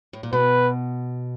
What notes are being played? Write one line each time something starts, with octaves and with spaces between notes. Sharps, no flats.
A2
A#2
B2 B4